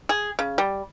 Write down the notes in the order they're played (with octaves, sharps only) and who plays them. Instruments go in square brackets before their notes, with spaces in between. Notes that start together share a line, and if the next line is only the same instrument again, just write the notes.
[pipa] G#4
C#3
G3